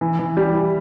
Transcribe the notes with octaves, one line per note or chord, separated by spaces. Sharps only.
E3
E3
G3
E3